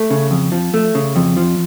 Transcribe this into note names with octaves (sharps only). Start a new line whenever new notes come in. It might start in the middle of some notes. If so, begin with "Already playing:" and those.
Already playing: A3
C#3
F2
F3
A3
C#3
F2
F3